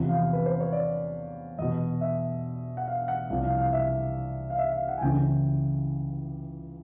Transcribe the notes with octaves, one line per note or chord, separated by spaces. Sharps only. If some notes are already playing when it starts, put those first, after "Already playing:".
Already playing: E2 C3 F3
F5
B4
C5
C#5
D5
E2 B2 D#5
E5
F#5
F5
F#5
C2 C3 F3 F5
F5
F5
E5
F5
E5
F5
F#5
G#5
C#2 C#3 E3 G5